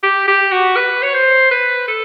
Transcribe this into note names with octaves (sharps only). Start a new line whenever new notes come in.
G4
G4
F#4
B4
C#5
C5
B4
A4